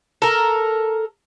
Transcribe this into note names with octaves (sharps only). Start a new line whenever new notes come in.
A4 A#4